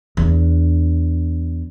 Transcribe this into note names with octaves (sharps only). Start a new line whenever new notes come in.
E2 D4